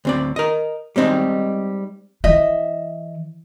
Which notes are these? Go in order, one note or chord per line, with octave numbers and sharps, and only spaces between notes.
D2 C4 D5
A#4 D#5
G3 G#3 C4 D#4
E3 D#5 E5